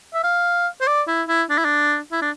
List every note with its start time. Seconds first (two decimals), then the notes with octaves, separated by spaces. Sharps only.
0.14 E5
0.24 F5
0.81 C5
0.87 D5
1.08 E4
1.28 E4
1.50 D4
1.58 E4
1.65 D4
2.12 E4
2.22 D4